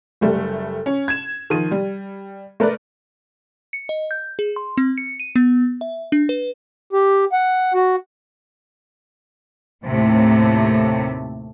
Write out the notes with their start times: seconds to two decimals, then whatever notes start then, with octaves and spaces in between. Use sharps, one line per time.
0.21 F#1 G3 A3
0.86 C#4
1.08 G#6 E7
1.50 D#3 F3 D#7
1.71 G3
2.60 A3 A#4 B4 D5
3.73 C#7
3.89 D#5
4.11 G6
4.39 G#4
4.56 C6
4.78 C4
4.98 C#7
5.20 D#7
5.36 B3
5.81 E5
6.12 D4
6.29 B4
6.93 G4
7.33 F#5
7.74 F#4
9.84 D#2 A2 C3 A3